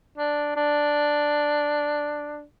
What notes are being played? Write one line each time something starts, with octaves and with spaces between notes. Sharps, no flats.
D4
D4